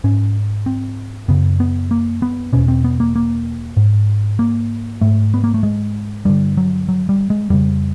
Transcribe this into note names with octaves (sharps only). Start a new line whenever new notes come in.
G#2 C#4
C4
F#2 C#3 B3
B3
A#3
B3
E2 B2 C#4
C4
B3
A#3
A#3
G#2
A#3
G#2 A3
B3
A#3
A3
G#3
G2 D3 G3
F#3
F#3
G3
G#3
F2 C#3 G3